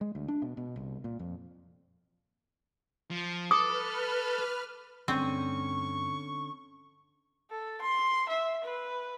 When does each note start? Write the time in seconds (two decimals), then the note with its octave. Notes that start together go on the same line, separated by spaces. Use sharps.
0.01 G#3
0.15 D2
0.28 D4
0.42 B2
0.57 B2
0.76 C2
1.04 A#2
1.19 F2
3.11 F3
3.51 A4 B4 D6 D#6 F6
5.08 D2 G2 D3 C4 C#4 C#6
7.50 A4
7.81 C6
8.29 E5
8.64 B4